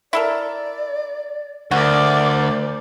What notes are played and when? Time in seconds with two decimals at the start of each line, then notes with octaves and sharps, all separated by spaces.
0.13 E4 A4 A#4 D5
1.71 D2 F#4 A#4 C5 D5